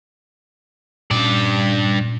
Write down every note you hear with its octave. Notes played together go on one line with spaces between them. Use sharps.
G2 A#2 C#4 D5